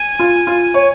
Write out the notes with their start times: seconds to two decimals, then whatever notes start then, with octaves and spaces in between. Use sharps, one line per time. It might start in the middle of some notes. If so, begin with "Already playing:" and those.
Already playing: G#5
0.19 F4
0.47 F4
0.74 C#5